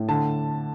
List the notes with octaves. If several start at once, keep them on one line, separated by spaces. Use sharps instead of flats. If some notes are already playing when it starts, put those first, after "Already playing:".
Already playing: A2
D3 A5